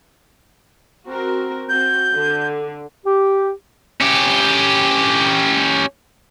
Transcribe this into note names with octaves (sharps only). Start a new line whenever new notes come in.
C4 F#4 A#4
C4 F#4 G6
D3
G4
C#4 G4